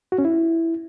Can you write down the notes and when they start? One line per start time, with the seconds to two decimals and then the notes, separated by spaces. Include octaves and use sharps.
0.12 F#4
0.18 C#4
0.25 E4